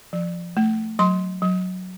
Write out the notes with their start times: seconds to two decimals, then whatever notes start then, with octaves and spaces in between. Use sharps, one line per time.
0.13 F3
0.57 A3
0.99 F#3 C6
1.42 F#3